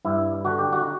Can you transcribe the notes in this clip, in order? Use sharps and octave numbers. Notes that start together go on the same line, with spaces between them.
G2 E4
D3 F#4
G4
F#4